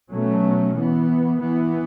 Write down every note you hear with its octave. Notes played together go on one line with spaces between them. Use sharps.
B2 F#3 A3 C#4
E3 B3
E3 B3